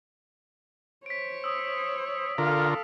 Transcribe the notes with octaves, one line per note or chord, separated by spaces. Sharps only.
C5 C#5 B6 D7
D#6 E6
D3 F4 A4 A#4 F5